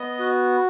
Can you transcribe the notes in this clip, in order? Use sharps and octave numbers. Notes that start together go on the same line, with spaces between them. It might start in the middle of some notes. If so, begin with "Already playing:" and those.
Already playing: B3 D#5
F#4